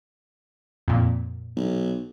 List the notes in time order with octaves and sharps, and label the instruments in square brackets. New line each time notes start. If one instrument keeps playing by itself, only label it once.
[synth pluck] F2 A#2
[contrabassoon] B1